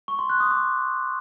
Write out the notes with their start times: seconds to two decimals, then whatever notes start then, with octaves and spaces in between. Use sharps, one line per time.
0.08 C#6
0.19 C6
0.30 F#6
0.40 D#6
0.51 D6